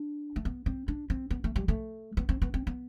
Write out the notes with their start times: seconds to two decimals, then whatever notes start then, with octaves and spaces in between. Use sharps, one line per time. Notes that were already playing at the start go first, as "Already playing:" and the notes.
Already playing: D4
0.36 A3
0.45 B3
0.66 C4
0.88 D4
1.10 C4
1.30 B3
1.44 A3
1.56 G3
1.68 A3
2.17 B3
2.29 C4
2.42 B3
2.54 C4
2.67 B3